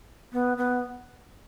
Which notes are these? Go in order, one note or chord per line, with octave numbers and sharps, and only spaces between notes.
B3
B3